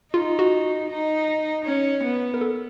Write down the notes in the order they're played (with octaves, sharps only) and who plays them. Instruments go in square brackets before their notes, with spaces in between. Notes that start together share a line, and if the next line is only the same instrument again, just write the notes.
[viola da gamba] D#4 [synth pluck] F4
[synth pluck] F#4
[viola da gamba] D#4
C#4
B3
[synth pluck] A#4
A4